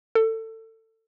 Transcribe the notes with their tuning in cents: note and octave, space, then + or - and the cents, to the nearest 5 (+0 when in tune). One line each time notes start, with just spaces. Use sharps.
A4 +25